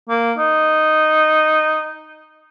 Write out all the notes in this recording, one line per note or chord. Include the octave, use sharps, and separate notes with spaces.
A#3
D#4